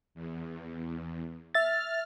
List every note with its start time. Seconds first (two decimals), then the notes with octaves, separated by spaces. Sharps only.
0.15 E2
1.55 E5 F6 A6